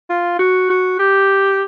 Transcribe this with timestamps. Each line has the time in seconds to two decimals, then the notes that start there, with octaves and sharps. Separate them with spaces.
0.10 F4
0.39 F#4
0.70 F#4
0.99 G4